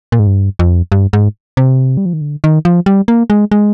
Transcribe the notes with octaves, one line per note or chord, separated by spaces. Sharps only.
A#2
G#2
G2
F2
G2
G#2
C3
G3
F3
D#3
D3
D#3
F3
G3
A#3
G#3
G#3